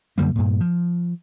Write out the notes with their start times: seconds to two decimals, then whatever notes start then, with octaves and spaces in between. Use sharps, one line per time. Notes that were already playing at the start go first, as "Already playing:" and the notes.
0.18 F#2 D3 G3 A#3
0.36 G2 A#2
0.61 F3